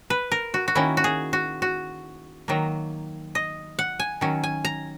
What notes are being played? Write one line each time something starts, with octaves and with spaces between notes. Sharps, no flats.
B4
A#4
F#4
F#4
D#3 A#3 C#4 E4
F#4
G#4
F#4
F#4
D#3 F#3 A#3
D#5
F#5
G#5
D#3 F#3 C#4
G#5
A#5